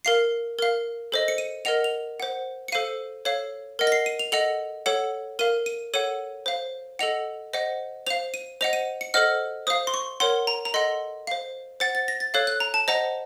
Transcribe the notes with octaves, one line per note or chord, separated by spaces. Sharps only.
A#4 F5 C7
A#4 F5
A4 C5 D#5
C#7
D#7
A#4 D#5 F#5 F7
F7
C5 F#5
C#7
A4 C5 F5 D#7
A4 C#5 F5
A#4 D#5 F#5
A#6
C7
D#7
F7
A4 D#5 F#5 F7
A4 C#5 F#5
A#4 F5 D#7
D#7
A4 C#5 F#5 D#7
C5 F5
A4 D#5 F#5 F7
C5 D#5 F#5
C5 F5 F7
D#7
C5 D#5 F#5 F7
D#7
C#7
A4 C5 D#5 F#5 F6
C5 F5 D#6
C6
C#6
A#4 C#5 F#5 C6
A#5
A#5
A4 D#5 F#5 C6
C5 F5
C5 F#5 A6
A6
A#6
A6
A4 C#5 F5 F#6
F#6
A#5
A5
C5 D#5 F#5 A#5